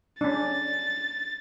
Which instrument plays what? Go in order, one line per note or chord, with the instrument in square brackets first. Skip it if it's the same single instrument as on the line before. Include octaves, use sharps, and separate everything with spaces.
[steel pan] C#4 D4 [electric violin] A6